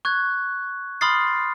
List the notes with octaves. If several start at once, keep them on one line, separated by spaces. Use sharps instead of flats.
C#6 F#6 G#6
B5 C6 D#6 F6 A6 C7